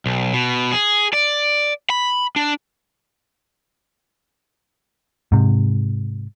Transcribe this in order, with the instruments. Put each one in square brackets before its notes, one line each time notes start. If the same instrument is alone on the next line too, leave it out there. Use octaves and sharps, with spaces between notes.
[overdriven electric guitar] B1
B2
G#4
D5
B5
D4
[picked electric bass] G#2 C3